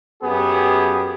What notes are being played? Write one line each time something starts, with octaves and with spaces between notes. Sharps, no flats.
F#2 B3 G4 G#4